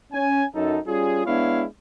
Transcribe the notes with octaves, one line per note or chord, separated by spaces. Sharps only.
C#4 G#5
F#2 D#4 A4
G3 C#4 F4 G#4
G#3 B3 D4 E4 C#5 F5